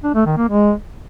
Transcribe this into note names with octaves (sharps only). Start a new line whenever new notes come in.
D4
A3
D#3
A#3
G#3